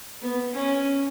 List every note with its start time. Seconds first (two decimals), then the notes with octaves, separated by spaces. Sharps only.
0.21 B3
0.54 C#4